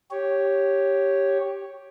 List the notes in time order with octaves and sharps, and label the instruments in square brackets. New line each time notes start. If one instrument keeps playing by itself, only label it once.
[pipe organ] G4 C#5